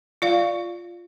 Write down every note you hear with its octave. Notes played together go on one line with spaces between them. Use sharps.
F4 D5 F5